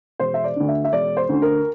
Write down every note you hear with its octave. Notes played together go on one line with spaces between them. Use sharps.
E1 C5
E5
D5
D2 D3
E5
E5
E1 D5
C5
D2 D3
A#4